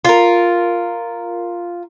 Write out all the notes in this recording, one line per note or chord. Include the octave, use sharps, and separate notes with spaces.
F4 A#4